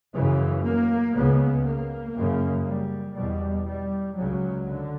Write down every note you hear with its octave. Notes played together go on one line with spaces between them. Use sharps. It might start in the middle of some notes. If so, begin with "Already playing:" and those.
F#2 C#3 E3
A#3
C#2 C#3 B3
A#3
F#2 C#3
G3
E2 B2 G3
G3
C#2 C#3 F#3
D3